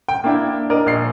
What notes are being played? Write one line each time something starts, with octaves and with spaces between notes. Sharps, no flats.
G5
A#3 D4 E4 G5
D4 A#4 D5 D#5
A#1 C7